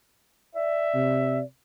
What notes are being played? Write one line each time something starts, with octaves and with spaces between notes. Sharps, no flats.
D5 E5
C3